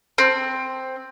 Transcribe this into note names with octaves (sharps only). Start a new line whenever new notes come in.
C4